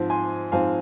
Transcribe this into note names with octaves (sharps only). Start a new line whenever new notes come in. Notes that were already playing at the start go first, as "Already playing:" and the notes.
Already playing: G#2 F3 C4
G#5 C6
G#2 F3 C4 F5 G#5